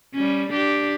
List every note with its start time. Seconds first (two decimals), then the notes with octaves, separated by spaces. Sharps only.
0.14 G3 C#4
0.50 D4 G4